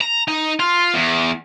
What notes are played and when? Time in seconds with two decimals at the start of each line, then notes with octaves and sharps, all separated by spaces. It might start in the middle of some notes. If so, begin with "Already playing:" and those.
0.01 A#5
0.28 D#4
0.60 F4
0.94 E2